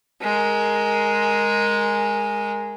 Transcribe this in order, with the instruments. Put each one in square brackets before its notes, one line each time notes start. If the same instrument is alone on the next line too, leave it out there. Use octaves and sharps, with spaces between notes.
[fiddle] G#3 A#4